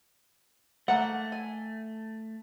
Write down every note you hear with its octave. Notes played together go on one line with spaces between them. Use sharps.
A3 A#3 F#5
G#5